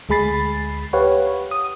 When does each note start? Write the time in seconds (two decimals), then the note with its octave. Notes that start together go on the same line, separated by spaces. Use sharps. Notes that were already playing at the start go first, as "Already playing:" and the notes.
0.09 D2 G#3 G#4 B5 A6 C7
0.93 G4 B4 C#5 F5 F#5
1.51 D#6